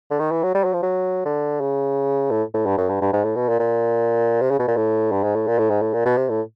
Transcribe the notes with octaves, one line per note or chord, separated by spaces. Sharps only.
D3
D#3
E3
F#3
G3
F#3
F3
F#3
D3
C#3
A2
A2
G2
F#2
G2
G2
G#2
A2
B2
A#2
A#2
C3
C#3
B2
A#2
A2
G2
G#2
A2
A#2
A2
G#2
A2
A#2
B2
C3
A2